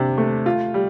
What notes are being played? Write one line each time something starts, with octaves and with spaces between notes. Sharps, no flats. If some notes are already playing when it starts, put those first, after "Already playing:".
Already playing: C3 D4
A3
F4
G3